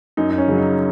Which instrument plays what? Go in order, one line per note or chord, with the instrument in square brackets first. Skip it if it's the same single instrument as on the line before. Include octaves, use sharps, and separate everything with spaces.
[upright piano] F#2 D#4
D#4
C#4
C#3 F#3
D#4